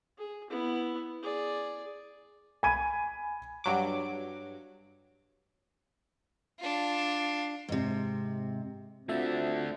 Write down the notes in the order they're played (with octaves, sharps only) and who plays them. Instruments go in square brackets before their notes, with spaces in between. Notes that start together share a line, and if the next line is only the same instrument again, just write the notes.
[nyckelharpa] G#4
B3 E4
G#4 D5
[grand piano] G#5 B5 G#6 D#7
[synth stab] G2 F#3 D6
[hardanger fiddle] D4 F4
[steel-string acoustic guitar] G#2 C3
[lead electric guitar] A3 D4 [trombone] C4 [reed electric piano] F4 F#4 [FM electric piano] E5